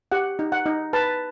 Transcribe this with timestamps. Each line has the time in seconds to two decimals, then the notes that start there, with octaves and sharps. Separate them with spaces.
0.12 G4 F#5
0.39 D#4
0.52 F#5
0.66 D#4
0.93 B4 A5